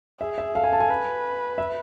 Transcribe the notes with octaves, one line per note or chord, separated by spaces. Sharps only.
G#4 E5
E5
A4 F5
G#5
A5
G#5
B4
E5